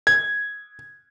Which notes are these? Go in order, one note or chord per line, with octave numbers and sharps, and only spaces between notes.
G#6